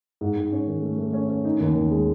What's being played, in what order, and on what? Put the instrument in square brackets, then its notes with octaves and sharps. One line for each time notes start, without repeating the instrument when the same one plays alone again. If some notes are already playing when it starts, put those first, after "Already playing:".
[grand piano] G#2
G#2
C#4
D#3
A3
A3
C#4
C#4
D#4
D#2
D#2
G#3